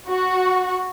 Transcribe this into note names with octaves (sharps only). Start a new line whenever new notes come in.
F#4